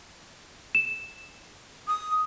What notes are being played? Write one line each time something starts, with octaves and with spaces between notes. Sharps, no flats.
E7
D#6